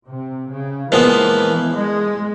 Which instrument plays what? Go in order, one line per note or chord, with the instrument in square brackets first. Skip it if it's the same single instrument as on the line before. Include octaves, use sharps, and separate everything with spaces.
[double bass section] C3
C#3
[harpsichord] A#2 F3 G#3 B3 [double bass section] E3
[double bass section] G#3